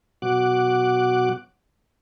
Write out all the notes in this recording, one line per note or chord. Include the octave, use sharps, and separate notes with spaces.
B2 F#3 F#4 D6 F#6